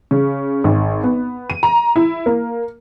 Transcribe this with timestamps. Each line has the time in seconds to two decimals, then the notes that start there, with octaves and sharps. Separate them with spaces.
0.11 C#3
0.64 G#1
1.04 B3
1.50 D#7
1.63 A#5
1.96 E4
2.26 A#3